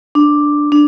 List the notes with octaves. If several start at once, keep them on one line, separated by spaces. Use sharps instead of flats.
D4
D4